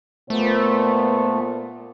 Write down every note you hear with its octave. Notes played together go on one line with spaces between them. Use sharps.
A#2 A3 B3 C5